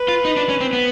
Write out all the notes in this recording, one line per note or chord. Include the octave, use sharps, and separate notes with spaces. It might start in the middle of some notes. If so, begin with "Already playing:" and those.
Already playing: B4
F4
D#4
D4
C#4
C4
B3